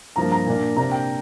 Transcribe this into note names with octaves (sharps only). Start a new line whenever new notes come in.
G2 F3 A#3 A#5
A#5
A#2 A#3 D4
C3 A#3 D4 A#5
G5